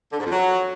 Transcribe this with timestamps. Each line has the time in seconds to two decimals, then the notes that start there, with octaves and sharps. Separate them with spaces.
0.12 D3
0.19 G#2
0.25 F2
0.32 F#3